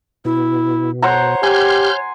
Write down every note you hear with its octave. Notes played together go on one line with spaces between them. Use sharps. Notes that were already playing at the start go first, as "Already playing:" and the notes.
B2 E4
C5 C#5 F#5 A#5
G4 G#5 C6 F6 G6